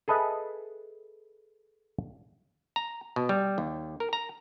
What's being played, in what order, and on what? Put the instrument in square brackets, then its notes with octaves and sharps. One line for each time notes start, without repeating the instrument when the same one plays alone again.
[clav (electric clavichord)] G#4 A4 B4 D#5 E5
A#5
B2
G3
D#2
A#4
A#5